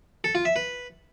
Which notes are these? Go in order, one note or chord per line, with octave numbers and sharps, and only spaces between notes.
A4
F4
E5
B4